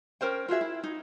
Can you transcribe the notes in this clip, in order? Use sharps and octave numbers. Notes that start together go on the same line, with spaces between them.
C#4 A#4 C5 G5
F4 F#4 G#4 E5
E4
D#4